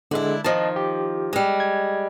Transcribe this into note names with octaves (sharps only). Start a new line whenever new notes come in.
D3 G#3 D4 E4
D#3 F3 D#5 A5
G4
G3 G#3
G#6